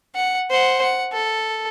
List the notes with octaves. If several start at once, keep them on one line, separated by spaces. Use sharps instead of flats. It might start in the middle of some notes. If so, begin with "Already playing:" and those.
F#5
C5 F#5
F#5
A4